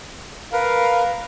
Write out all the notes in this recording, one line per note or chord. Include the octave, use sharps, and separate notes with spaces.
A#4 B4 F5